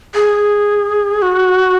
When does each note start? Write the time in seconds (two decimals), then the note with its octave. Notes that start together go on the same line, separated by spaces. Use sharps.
0.15 G#4
1.22 F#4